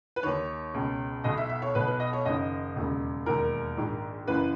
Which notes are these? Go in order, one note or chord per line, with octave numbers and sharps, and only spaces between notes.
B4
D#2 D#3 C#5
C#2 B2
B1 B2 D#5
E5
E5
C#5
B1 B2 B4
B4
D#5
C#5
F#1 F#2 D#3 D#5
E1 D#2 C#3
E1 D#2 D#3 A#4
A#1 G#2 D#3
F#1 F#2 E3 B4